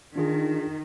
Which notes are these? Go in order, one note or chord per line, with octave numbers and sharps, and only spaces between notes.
D#3 D4 F4 G#4